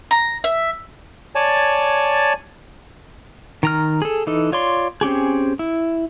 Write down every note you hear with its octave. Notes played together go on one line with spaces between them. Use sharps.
A#5
E5
C#5 D5 G#5 A5
D#3 A#5 F6
G#4 A4
E3 D#4 A4
F4 C#5 D5 C6
C4 C#4 G4 G#4
E4